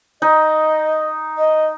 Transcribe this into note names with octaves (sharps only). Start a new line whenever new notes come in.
D#4 D#5
D#5